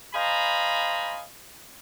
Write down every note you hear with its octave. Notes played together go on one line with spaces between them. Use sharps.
C5 D#5 F5 G#5 A#5 B5